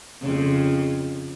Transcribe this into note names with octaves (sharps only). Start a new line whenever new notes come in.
F2 C#3